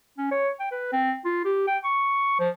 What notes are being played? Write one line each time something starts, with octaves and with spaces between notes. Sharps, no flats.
C#4
C#5
G5
B4
C4
F4
G4
G5
C#6
F3